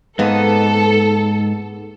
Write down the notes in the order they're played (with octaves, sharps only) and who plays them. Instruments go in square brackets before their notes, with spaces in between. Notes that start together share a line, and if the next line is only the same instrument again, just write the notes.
[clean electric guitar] G#2 [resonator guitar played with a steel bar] A#3 B3 D#5 [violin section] A4